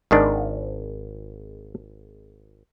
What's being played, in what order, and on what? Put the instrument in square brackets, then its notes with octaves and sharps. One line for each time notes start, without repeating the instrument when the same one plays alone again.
[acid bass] G#1 [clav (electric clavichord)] G#2 D#3 D4